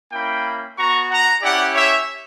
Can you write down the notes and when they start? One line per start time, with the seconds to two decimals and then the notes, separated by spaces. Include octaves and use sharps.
0.12 A#3 C#4 E4 G5 B5
0.77 B3 F#4 A#5 C#6
1.11 F#5 A#5
1.42 C#4 E4 G4 D5 F#5
1.75 C#5 E5